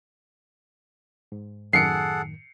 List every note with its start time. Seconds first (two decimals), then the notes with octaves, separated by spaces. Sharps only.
1.32 G#2
1.73 F#2 A2 D#3 G#4 A4 F#5 C7 C#7